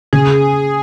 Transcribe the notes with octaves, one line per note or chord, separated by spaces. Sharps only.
C#3 G#4